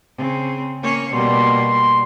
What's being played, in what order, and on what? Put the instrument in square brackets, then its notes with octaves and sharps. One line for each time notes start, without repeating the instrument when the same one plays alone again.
[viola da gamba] C#3 C4
A#3 C#4 C#5
[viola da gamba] B2 G3 A#3 [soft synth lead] C6